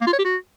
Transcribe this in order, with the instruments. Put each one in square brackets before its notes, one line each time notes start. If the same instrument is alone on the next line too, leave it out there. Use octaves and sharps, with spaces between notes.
[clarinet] A#3
F4
C#5
G4
F#4